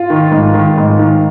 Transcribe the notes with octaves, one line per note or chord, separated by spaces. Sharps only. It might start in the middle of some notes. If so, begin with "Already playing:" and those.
Already playing: F4
D#3
G#2
D#3
G#2
D#3